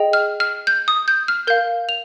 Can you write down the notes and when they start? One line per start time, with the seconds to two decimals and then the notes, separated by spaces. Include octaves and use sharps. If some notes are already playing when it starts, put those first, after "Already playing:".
Already playing: G#4 D#5 G5
0.13 F6
0.40 F6
0.67 G6
0.88 D#6
1.08 G6
1.28 F6
1.47 A#4 F5 G6
1.89 F7